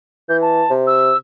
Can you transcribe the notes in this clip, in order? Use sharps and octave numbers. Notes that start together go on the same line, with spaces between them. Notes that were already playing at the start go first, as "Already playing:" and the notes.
E3 G6
A5
C3
E6